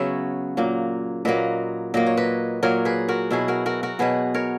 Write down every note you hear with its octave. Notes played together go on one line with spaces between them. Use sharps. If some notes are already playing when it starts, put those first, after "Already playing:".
Already playing: C#3 F#3 B3 C#5 E5
A#2 F#3 A#3
A#2 F#3 A#3 B4 D#5
A#2 F#3 A#3 D#5
C#5
B4 D#5
A#2 F#3 A#3 A#4 C#5
G#4 B4
F#4 A#4
B2 F#3 B3 E4 G#4
F#4 A#4
F#4 A#4
F#4 A#4
B2 F#3 B3 G#4 B4
A#4 C#5